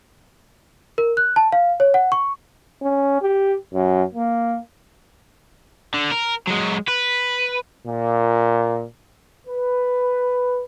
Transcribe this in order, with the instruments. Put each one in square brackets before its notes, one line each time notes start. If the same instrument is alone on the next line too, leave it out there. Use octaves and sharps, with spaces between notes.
[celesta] A#4
F#6
A5
F5
C#5
F#5
C#6
[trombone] C#4
G4
F#2
A#3
[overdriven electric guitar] D3
A#4
F#3 G#3
B4
[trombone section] A#2
B4